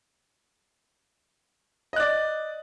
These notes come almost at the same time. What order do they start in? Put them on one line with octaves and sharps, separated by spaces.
D#5 F#6 D5